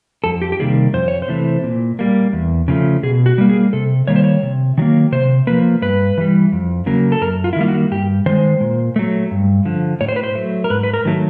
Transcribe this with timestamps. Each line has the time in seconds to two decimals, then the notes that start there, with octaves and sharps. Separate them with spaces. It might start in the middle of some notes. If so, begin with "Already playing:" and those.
0.24 F2 A4
0.42 G4
0.52 G4
0.60 C3 D#3 G3 A#3 G#4
0.94 F2 C5
1.08 C#5
1.22 C5
1.28 C3 E3 A3
1.63 A#2
1.99 G3 A#3
2.33 E2
2.68 C#3 F3 A3
3.03 B2 G#4
3.26 F#4
3.38 G3 A#3
3.49 G#4
3.73 C3 A4
4.07 D#3 G3 A#3 C#5
4.16 C5
4.24 C#5
4.43 C3
4.78 D#3 F#3 A#3
5.12 C3 C5
5.47 F3 A#3 B4
5.82 G2 B4
6.18 E3 G3
6.52 F2
6.86 C#3 F#3 A#3
7.12 A4
7.21 F#2 A#4
7.44 F4
7.53 E4
7.56 D#3 G3 A#3 F4
7.68 F#4
7.91 G2 G4
8.26 D#3 G#3 C5
8.61 A#2
8.96 F#3 A3
9.31 G2
9.65 D3 F3
10.01 A2 C#5
10.08 C5
10.16 B4
10.23 C5
10.35 F#3 A3
10.64 A#4
10.70 G#2 B4
10.83 B4
10.93 A#4
11.05 D#3 F#3 A3